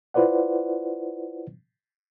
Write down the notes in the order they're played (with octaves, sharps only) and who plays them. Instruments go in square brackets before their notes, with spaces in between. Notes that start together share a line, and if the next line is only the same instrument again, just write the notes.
[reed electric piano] E4 F4 B4 C5 D5 F#5